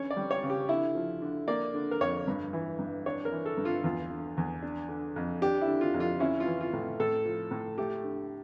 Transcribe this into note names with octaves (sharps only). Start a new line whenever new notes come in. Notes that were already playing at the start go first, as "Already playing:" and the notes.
Already playing: D3 C#4 C#5
D5
G3
C#5
C#3
G4
D3 E4
F3
D3
A#3 D5
D3
A#4
F2 C#5
G2
E3
G2
D4 C#5
A#4
E3
A4
G2
F4
E2 F4
D3
E2
D4
D3
F2
D4 G4
E4
D3
F4
F2
F4
C#4 E4
F4
E3
F4
A2
A2 A4
F3
A2
A3 G4
D3